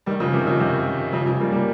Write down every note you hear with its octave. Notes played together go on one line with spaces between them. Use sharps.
D#3 G3
C#3 F3
C3 D#3
C#3 F3
C3 D#3
C#3 F3
C#3 F3
G3 A#3
G3 A#3